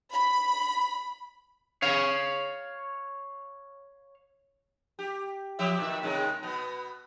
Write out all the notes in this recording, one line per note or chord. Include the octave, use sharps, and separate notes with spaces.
B5
C#5 F5
G4
F3 G4 E5
A#2 D#3 E5
C3 D#3 G#3
B2 B3